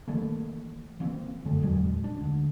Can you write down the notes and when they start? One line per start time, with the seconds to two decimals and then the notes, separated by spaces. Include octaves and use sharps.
0.08 D#3 E3 A3 A#3
1.00 E3 A#3 C4
1.45 G1 F#2 D3 A3
1.61 E2 A#2 F#3 G#3
2.04 D4
2.20 D2